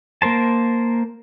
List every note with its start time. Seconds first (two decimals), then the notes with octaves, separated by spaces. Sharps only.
0.22 A#3 A#4 C5 A5